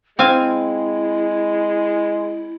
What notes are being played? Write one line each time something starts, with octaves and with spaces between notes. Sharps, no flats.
G#3 C4 E4 F5 G#5